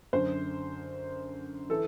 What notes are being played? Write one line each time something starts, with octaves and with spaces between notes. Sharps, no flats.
F#2 D3 C5
E3 A4